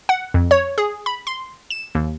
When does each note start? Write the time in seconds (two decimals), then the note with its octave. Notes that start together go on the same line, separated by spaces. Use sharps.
0.09 F#5
0.34 F2
0.51 C#5
0.78 G#4
1.06 B5
1.27 C6
1.70 E7
1.95 D#2